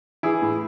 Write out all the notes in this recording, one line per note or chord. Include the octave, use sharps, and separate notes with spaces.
E3 E4 G#4
A2